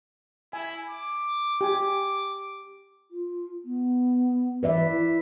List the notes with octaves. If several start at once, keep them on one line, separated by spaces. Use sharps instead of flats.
E4 G#5
D6
G4 G#5
F4
B3
E3 B4 D5 E5
E4